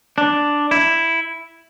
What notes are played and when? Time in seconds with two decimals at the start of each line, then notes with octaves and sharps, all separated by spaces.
0.18 D4
0.71 E4